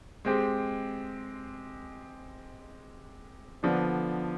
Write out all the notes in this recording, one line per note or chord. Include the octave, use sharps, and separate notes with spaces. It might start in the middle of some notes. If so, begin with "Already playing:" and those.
G#3 C4 G4
D3 F3 B3 D4